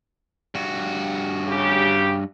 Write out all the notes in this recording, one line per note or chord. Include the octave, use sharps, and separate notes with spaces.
G2 F#4
C#3 G4